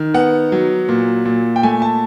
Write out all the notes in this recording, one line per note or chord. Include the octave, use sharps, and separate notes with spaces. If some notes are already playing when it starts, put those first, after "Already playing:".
Already playing: D#3
B3 F#5
F#3
A#2
A#2
G5
A3 G#5
A5